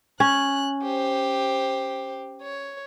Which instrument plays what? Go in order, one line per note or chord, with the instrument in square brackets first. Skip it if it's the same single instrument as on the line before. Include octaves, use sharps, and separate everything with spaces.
[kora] C#4 [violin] F#6
[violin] G4 C5
C#5